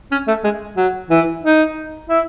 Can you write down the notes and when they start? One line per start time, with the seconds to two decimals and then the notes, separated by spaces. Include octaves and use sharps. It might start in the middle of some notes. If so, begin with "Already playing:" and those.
0.12 C#4
0.28 A3
0.44 G#3
0.77 F#3
1.10 E3
1.43 D#4
2.09 E4